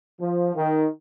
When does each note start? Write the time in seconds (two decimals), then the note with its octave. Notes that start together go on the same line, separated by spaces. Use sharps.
0.20 F3
0.56 D#3